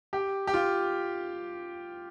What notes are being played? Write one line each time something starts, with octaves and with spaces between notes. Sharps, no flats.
G4
G4
F4